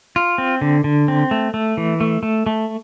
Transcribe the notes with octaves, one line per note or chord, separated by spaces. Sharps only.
F4
C4
D3
D3
C4
A3
A3
E3
A3
A3
A3